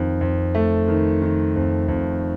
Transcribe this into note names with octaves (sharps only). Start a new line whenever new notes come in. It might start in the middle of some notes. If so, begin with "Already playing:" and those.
Already playing: F2 D#3
F2
A3
D#3
D#3
F2
F2